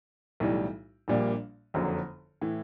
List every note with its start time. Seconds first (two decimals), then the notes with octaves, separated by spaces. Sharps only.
0.40 B1 A2 E3 G3
1.08 A#1 A#2 G3 A#3 D4
1.74 F#1 F2 D3 F#3
2.41 A2 E3